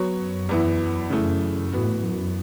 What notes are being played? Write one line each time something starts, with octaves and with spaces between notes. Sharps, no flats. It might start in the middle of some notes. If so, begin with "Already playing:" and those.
Already playing: F#3 B3 F#4 C#5
F#2
E2 E3 B3 E4
F#2 C#3 E3 A3
A2 E3 B3 F#4
F#2